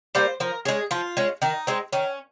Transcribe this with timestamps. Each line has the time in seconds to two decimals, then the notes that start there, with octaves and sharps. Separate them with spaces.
0.15 G3 A#3 C5
0.40 F3 A#4
0.65 G#3 C#4 G#4
0.91 F3 F4
1.17 G#3 C#4
1.42 D#3 D#4
1.67 G#3 C4
1.93 D#3 C#4